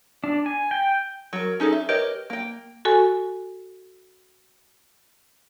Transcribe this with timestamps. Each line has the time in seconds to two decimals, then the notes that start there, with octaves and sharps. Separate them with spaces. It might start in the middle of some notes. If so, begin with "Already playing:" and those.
0.24 D4
0.46 G#5
0.71 G5
1.33 F#3 A#4
1.60 C#4 D#4 G#4 A4
1.73 E5
1.89 G4 A#4 B4 C#5 D#5
2.30 A#3 G5
2.85 F#4 A4 G#5